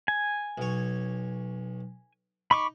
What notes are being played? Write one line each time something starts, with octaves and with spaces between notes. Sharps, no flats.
G#5
B1 C#5
D#4 B5 C#6 D6